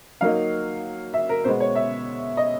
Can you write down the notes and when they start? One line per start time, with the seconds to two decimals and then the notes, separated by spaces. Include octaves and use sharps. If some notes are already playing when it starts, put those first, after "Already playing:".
0.21 F#3 A#3 D#4 F5
1.14 E5
1.29 A#4
1.44 B2 G#3 B3 C5
1.60 C#5
1.75 E5
2.37 D#5